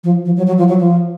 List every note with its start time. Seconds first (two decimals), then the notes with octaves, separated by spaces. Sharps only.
0.04 F3
0.25 F3
0.37 F#3
0.47 F#3
0.58 F3
0.68 F#3
0.79 F3